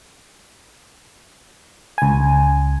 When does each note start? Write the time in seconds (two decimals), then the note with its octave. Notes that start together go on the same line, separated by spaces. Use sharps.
1.98 C#2 G#5